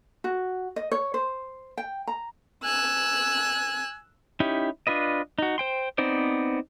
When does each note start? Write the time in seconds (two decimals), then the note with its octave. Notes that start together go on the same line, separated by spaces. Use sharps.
0.24 F#4
0.76 D#5
0.92 C#5
1.14 C5
1.78 G5
2.07 A#5
2.65 G#5 E6 F#6
4.40 C#4 D#4 E4 G4
4.87 D4 F4 B4 D#5
5.38 D#4 F#4
5.58 C5 G5 C6
5.98 B3 C4 D#4 C5 D5